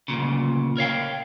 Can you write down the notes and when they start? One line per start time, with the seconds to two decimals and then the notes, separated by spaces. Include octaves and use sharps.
0.08 D2 A#2 C#3
0.77 A#4 C#5 F5 G5